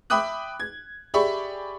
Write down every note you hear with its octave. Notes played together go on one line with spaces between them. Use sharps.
E5 G5 B5 D6 D#6 F#6
G#6
G4 G#4 D5 E5 B5 C#6